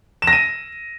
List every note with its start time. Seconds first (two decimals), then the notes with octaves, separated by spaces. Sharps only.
0.22 E7
0.27 A#6
0.33 D#7